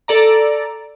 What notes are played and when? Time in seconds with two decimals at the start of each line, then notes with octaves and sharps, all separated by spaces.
0.08 A4 D5 A#5